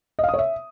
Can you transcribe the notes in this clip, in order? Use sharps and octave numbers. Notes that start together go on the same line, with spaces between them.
D#5
F5
D#6
C#5
E5